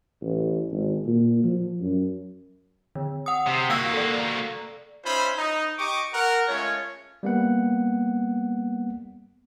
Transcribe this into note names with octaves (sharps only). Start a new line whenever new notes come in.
A1
G#1
A#2
F3
F#2
D3
F#5 D#6
C3
A#3 F#4 F5 E6 C#7
A4 D5
C#4 D#4 F4 C5 E5 B5
D#4
G4 D#5 C#6 D6
A#4 F#5
G#3 A3 C#4 F4 C#5
G3 A#3 B3 F#5